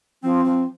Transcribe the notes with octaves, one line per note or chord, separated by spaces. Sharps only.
F3 C4
F3